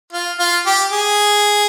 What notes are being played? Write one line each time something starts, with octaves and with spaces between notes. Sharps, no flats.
F4
F4
G4
G#4